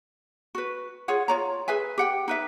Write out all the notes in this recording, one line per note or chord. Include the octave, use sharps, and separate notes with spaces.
F#4 B4
F4 G#4 C#5 F#5
F4 C#5 A#5
G#4 B4 E5 G#5
G4 F#5 G5
D#4 B4 E5